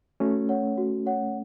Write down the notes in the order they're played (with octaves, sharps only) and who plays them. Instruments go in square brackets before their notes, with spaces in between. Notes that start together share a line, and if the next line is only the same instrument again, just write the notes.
[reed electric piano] A3 C#4 [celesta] F#4
[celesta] C#5 F#5
F#4
C#5 F#5